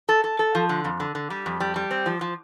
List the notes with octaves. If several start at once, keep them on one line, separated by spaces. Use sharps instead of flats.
A4
A4
A4
F3
D3
F2
D3
D3
G3
F2
G3
G3
C4
F3
F3